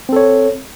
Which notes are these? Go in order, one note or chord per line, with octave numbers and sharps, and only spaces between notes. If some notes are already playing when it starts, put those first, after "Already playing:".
C4 A4 C#5